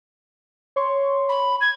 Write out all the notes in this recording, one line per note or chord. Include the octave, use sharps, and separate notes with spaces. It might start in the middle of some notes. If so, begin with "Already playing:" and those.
C#5 C6 C#6
B5
G#6